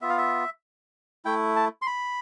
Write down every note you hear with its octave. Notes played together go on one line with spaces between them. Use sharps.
B3 F4 E5
F5
E5
A3 E4 G5
A5
C6
B5